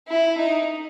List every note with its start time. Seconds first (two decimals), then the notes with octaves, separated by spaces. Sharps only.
0.08 E4
0.37 D#4